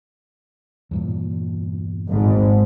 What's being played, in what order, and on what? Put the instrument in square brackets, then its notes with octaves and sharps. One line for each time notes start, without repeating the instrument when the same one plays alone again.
[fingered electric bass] E2 G2 A#2
[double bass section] G#1 G#2